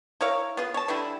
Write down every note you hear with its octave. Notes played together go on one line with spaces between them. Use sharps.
E4 A#4 C#5 F5
B3 F4 G#4
C#5 A5
D3 E3 G3 E4